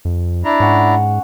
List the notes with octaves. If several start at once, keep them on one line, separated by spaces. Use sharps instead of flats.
F2
D4 E4 A#5
G#2 C#4 F#5